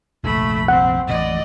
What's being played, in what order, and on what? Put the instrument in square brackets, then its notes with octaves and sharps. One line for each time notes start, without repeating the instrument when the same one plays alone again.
[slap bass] F1 A#1 [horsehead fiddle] A3 B5
[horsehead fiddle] C4 [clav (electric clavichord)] F#5
[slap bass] A1 F2 [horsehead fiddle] D5 D#5